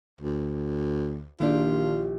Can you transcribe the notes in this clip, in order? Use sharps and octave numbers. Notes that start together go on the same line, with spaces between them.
D2
A#1 D#3 A#3 D4 E4 F4 G4